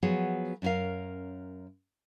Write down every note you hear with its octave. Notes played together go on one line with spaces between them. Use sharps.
F3 F#3 B3 F#4 G#4 C#5
F#2 C#4 E4 A#4 F5